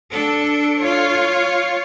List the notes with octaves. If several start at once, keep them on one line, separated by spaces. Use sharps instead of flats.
D4 A4
F4 C#5